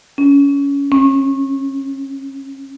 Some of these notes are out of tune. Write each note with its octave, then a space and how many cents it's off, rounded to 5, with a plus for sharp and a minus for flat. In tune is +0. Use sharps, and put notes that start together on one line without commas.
C#4 +20
C#4 -30